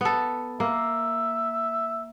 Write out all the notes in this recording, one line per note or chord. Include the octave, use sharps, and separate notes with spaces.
B3 A4
A#3 E5